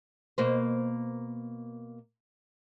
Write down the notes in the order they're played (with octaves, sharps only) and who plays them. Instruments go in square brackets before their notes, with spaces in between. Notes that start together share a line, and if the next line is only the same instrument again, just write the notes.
[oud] B2 A#3 C5